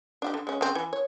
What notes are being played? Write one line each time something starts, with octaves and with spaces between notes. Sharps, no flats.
D4 F#4 G4
D3
G#3 C#4
C#3 C4
E3
C#5